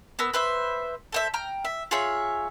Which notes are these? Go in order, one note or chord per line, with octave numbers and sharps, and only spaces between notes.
B3 A#4 E6
B4 C5 E5
A4 C5 E5
G5 A#5 F6
E5
F4 G#4 C#5 E5